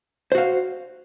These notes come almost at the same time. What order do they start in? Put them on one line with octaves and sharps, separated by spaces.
C5 F#4 F5